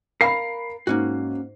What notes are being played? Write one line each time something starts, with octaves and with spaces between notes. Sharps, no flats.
A#4 F5 B5 C7
G#2 A#3 C#4 F#4